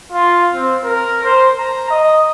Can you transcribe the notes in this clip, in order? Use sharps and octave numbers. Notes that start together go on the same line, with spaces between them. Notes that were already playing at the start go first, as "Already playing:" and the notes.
F4
C4
A#4
C5
A#5
D#5